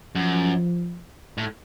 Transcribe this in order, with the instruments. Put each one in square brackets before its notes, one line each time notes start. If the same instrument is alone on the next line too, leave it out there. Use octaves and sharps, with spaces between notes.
[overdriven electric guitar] F#2 [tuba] F3
[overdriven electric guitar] A2